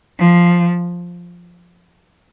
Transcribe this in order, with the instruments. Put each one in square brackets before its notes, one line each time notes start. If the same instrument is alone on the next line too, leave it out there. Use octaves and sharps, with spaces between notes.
[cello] F3